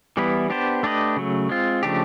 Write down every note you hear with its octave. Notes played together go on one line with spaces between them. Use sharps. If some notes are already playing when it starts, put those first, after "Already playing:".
E3 G3 B3 E4
B3 D4 G4 C5
A3 D4 G4 B4 D#5
C#3 F#3 A3
G#3 C4 F4
C#3 F3 A3 D4 G4